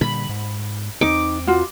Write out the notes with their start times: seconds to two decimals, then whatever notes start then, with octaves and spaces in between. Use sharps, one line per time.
0.01 A#2 D3 G3 B5
0.29 G#2
1.01 E2 C4 D#4 D6
1.47 F4 F#4